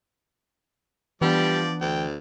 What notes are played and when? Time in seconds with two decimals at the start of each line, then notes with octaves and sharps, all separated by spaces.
1.21 E3 F3 G3 B3 D4 D5
1.80 D2 G5